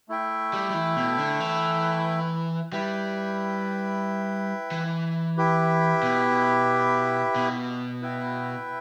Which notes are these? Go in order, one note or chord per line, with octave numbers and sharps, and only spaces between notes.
A3 E4 A4 E5 G5
G3
G3
E3
B2
D3
E3
G3 E4 B4 E5 G5
E3
E4 G4 B4 E5 G5
B2
B2
E4 B4 E5 G5